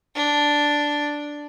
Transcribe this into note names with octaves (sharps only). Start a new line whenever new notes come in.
D4